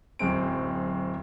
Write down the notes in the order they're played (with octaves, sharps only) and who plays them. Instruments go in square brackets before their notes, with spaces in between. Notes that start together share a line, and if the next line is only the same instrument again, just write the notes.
[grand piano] D1 F#2 G#3 C4 D7